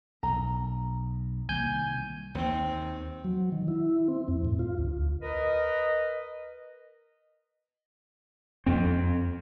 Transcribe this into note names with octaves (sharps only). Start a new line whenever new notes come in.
B1 A#5
C2 D#3 A#3 G#5 G6
D#2 D#3 C4
F#3
D#3
E4
C4
F2
A2
F4
D2
A#4 B4 D#5
F2 C4